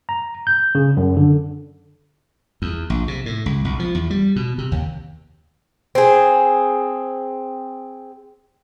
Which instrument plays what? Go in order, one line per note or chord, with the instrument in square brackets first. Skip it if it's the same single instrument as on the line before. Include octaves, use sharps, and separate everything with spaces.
[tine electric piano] A#5
G6
C#3
F#2
D3
[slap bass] E2
A#1
C3
A2
C#2
B1
F3
E2
G3
B2
C3
D#2
[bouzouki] C4 G#4